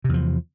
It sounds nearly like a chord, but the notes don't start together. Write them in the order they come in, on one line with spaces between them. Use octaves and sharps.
C3 E2 F3